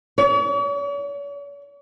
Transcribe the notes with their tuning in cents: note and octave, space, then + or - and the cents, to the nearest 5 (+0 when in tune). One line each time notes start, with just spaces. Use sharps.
C#5 +45